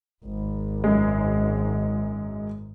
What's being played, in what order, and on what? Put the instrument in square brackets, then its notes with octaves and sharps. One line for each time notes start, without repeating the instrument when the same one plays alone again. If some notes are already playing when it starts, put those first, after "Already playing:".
[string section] G#1
[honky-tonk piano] F#2 G#3